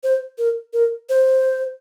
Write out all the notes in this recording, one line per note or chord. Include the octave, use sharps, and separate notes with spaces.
C5
A#4
A#4
C5